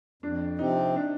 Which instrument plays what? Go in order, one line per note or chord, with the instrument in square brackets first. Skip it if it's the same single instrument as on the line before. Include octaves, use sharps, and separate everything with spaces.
[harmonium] F2 [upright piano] D4
[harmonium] C3 F3 C4 G4 [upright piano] D#4
[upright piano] D4